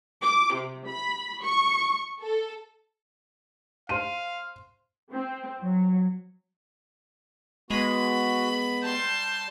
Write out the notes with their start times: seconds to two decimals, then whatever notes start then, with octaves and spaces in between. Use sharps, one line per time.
0.23 D6
0.54 C3
0.86 B5
1.43 C#6
2.22 A4
3.89 C5 F5 C6 D#7
5.13 C4
5.62 F#3
7.70 G#3 B3 F#4 B5
8.83 G3 A5 C6 G6